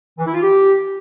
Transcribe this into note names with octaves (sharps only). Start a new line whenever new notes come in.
E3
E4
F4
G4